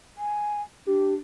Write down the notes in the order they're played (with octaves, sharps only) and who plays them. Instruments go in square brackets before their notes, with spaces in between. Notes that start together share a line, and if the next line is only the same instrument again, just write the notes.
[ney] G#5
[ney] D4 [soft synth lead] G4